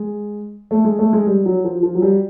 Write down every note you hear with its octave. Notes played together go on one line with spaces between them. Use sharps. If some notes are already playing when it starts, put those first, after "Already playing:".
Already playing: G#3
A3
G#3
A3
G#3
G3
F#3
F3
F3
F#3
G3